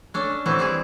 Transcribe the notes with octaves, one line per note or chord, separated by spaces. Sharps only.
C#4 D4 A4
E3 C4 E4 F#4 A4
G3 E4 G#4